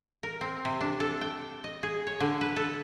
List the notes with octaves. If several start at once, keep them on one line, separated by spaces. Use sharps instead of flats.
A#4
C4
C3
D4
A4
G5
D#5
G#4
C#5
D3
B4
A4